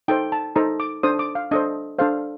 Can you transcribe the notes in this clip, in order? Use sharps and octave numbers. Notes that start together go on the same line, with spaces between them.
D#4 A4 C5 G5
A5
D#4 A4 C5 A#5
D6
D4 A4 C5 D#6
D6
F5
D4 A4 C5 D#5
D4 A4 C5 F5